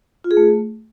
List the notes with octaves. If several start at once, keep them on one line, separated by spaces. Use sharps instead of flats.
F4
G#4
A3